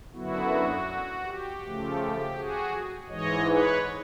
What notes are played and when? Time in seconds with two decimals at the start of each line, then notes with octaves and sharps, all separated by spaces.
0.13 F#2 D3 F#3 B3 E4 F#4
1.25 G4
1.62 C#3 F3 A3
2.35 F#4 G#4
3.09 G#2 E3 G#3 C#5 D#5
3.46 B4 C#5